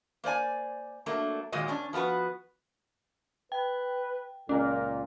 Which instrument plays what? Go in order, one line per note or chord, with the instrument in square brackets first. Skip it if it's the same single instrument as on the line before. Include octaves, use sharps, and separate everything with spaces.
[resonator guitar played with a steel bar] A#3 C5 D5 G#5
F#3 A3 A#3 D4
A#2 D#3 F#3 G#3 D#5
E2 C#4 D4
F3 B3 F4 F#4 B4
[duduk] B4 [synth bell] G5
[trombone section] C#2 A#2 [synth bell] C#4 [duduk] A#4